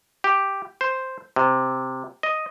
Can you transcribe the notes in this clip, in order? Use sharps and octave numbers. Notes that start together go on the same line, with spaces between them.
G4
C5
C3
D#5